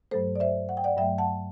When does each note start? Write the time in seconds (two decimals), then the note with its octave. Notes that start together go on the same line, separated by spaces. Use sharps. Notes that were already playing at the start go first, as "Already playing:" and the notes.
0.11 G2 F#3 A3 A4 C5
0.36 D5
0.40 C5 E5
0.69 F#5
0.77 G5
0.84 D5 F#5
0.97 G2 F#3 A3 E5 G5
1.18 F#5 A5